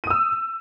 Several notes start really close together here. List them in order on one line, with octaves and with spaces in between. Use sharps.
D#7 D#6 E6